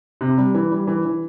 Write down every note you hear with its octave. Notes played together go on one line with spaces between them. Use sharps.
C3
G3
E3
G3
E3
E3